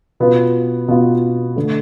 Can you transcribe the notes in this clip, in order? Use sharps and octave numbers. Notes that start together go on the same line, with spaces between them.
B2 B3 F4
B2 B3 F4
D3 A3